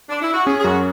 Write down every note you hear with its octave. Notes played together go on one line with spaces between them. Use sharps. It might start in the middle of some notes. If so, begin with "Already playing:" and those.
D4
E4
F#4
C#4 G#4
G#4
F#2 F#4